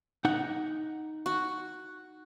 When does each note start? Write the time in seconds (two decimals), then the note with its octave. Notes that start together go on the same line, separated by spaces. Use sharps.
0.25 D#4 F#5
1.26 F#4